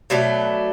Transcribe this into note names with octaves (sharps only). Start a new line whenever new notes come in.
B2 F#3 A3 D4